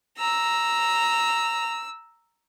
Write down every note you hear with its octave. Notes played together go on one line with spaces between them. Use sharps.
A#5 E6